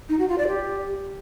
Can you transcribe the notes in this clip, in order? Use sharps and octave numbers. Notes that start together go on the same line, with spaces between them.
D#4
F#4
F4
D5
G4